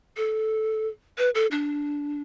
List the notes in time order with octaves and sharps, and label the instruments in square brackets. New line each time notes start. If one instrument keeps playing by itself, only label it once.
[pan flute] A4
B4
A4
D4